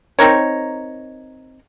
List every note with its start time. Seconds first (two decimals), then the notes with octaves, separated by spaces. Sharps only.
0.19 C4 D#4 A#4 C#5